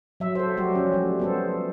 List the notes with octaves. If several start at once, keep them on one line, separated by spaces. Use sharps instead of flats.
F#3 E5
A4 C5
F#3 G3 A3 F#4 G4
F3 C#4
G3 A3
B3 A4 C5